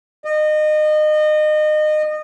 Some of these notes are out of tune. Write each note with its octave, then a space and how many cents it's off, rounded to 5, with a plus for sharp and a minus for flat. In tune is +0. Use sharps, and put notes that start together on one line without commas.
D#5 -30